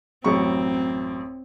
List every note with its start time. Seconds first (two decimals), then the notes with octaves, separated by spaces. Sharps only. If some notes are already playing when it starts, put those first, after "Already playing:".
0.24 A1 F#2 C4 C#6